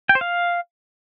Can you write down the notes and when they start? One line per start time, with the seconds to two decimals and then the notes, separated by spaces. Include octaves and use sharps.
0.09 G5
0.15 C5
0.21 F5